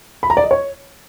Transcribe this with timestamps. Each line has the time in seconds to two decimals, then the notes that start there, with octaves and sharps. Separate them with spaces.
0.23 B5
0.30 A#5
0.37 D5
0.44 D#5
0.51 C#5